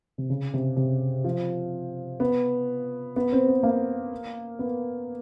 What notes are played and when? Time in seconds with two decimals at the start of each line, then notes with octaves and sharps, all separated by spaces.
0.18 C3
0.30 C#3
0.54 C3
0.77 C3
1.24 F3
2.20 B3
3.16 B3
3.33 C4
3.48 B3
3.63 A#3
4.59 B3